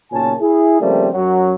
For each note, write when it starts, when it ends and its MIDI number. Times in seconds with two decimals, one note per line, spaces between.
0.11 0.32 35
0.11 0.32 46
0.11 0.32 49
0.11 0.32 61
0.11 0.32 80
0.11 0.32 81
0.40 0.77 64
0.40 0.77 68
0.81 1.08 49
0.81 1.08 53
0.81 1.08 55
0.81 1.08 57
0.81 1.08 58
0.81 1.08 60
1.13 1.54 42
1.13 1.54 54